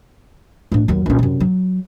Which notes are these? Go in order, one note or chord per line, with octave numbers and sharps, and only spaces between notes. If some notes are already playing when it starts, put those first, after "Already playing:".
A2 D4
D#2 F#3
A#1 C#4
F#2 C3
F#3